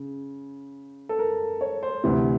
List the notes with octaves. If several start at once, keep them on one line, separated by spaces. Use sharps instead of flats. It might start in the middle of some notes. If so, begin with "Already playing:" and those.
Already playing: C#3
A4
A#4
C#5
C5
D2 C3 E3